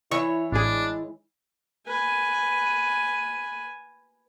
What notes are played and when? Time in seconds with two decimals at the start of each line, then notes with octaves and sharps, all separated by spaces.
0.11 E3 E4 C#5 C#6
0.52 A1 G#3 D4 G#4
1.88 B4 G#5